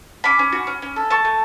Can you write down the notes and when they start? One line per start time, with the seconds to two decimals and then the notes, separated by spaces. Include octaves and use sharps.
0.24 C#4 B5 D6
0.39 C#4
0.53 F#4
0.67 C#4
0.82 C#4
0.96 A4
1.10 A3 A5 C#6
1.25 A3